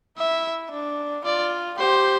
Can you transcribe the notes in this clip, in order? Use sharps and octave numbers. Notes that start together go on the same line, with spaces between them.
E4 E5
D4
F4 D5
G4 C5